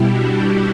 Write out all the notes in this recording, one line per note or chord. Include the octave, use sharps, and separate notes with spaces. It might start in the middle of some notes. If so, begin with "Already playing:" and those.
Already playing: B2 G3 E4 G4
D4 F#4
D4